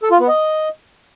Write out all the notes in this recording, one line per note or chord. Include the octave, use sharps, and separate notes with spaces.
A4
F4
B3
D#5